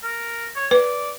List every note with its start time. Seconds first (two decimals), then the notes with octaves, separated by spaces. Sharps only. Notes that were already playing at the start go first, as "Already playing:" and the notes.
0.03 A#4
0.56 C#5
0.71 B4 D5